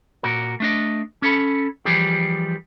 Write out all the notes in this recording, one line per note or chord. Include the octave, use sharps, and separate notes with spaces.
A#2 F#4 A#4
A3 D4 D#5
C#4 A4 B5
E3 F3 G3 G4 G#4